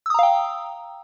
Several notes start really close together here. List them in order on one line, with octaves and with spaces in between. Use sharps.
E6 D#6 A#5 F5 G5